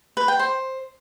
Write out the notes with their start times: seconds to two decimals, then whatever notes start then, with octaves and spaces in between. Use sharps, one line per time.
0.17 B4
0.28 G5
0.39 C5